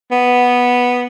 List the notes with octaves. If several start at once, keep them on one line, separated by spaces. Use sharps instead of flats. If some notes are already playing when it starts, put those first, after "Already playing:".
B3